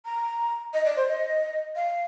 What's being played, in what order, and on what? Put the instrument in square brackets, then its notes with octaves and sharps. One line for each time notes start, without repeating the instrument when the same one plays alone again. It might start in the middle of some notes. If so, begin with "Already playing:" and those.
[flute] A#5
D#5
D5
C5
D#5
F5